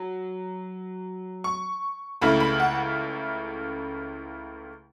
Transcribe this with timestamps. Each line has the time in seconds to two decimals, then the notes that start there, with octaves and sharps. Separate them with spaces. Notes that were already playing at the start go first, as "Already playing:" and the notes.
Already playing: F#3
1.44 C#6
2.21 C#2 C#3 A3 E4 B5
2.40 B5
2.60 F#5